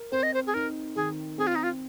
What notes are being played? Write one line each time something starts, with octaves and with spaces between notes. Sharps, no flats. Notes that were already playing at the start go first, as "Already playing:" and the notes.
Already playing: A#4
C4 C5
D#5
C5
G#4
D#4 A#4
D#3 G#4
C4 G#4
F4
D#4
F4